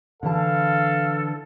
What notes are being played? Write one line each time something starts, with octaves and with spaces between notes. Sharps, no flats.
D3 E3 A4 F5 A5